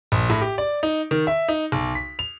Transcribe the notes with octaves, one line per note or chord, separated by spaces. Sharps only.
A#1
A2
G4
D5
D#4
D#3
E5
D#4
B1
B6
F7